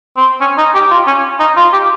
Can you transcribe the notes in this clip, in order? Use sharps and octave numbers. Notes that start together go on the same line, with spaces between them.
C4
C#4
D#4
G4
F4
C#4
D#4
F4
G4